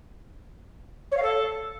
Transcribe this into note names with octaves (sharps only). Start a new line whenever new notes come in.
C#5
F5
A4